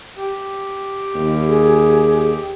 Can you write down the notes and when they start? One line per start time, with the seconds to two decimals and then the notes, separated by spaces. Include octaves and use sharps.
0.18 G4
1.15 D#2
1.47 G#4